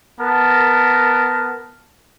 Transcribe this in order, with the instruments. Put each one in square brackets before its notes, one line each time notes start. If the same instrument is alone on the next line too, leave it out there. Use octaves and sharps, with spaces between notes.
[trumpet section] B3 A#4 A5